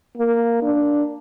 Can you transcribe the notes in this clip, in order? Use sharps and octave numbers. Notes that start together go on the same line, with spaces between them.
A#3
D4